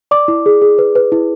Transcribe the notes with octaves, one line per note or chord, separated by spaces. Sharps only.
D5 D6
E4
G#4
G#4
B4
B4
E4